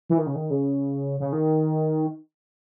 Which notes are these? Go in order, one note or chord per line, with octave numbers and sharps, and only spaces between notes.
E3
D#3
C#3
D#3
C#3
C#3
D#3